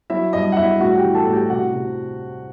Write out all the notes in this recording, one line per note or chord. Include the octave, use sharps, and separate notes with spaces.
F#3 E4 E5
G2 D#5
F#5
G2 E4 E5
A2 F#4 F#5
G4 G5
E3
A4 A5
A2
G4 G5
C3 F#4 F#5
C3